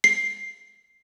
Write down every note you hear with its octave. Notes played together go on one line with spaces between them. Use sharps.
C7